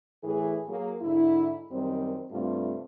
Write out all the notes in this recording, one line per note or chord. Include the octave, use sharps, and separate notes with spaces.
A2 E3 G#4
F#3 A#3 G#4
G#2 D3 E4
F#2 D#3 G3 C4
G2 C3 A3 C4 F4